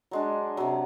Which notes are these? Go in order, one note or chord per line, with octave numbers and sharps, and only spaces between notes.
F#3 G#3 D4
C3 F#3